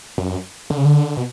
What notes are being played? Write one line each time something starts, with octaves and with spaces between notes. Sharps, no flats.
F#2
D3
C#3
D3
B2